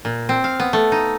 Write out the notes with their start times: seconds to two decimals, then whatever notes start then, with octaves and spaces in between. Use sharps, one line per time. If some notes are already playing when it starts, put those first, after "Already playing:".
0.05 A#2
0.29 C4
0.44 F5
0.60 B3
0.73 A3
0.92 D#4